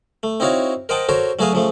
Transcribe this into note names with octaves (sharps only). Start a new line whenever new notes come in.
A3
C4 D#4 E4 F#4 C#5 F5
A#4 C5 D#5 F#5 G5 A5
F#4 A4 A#4 C5 C#5
F#3 A3 F#4 G#4 B4 F5
C#3 F3 A3